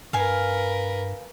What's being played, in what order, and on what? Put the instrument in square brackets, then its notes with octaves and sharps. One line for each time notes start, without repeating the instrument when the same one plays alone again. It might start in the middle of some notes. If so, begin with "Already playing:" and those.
[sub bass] G2 [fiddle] A#4 B4 [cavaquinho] F5 G#5